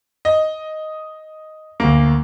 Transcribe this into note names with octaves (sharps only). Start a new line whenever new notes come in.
D#5
D2 A#3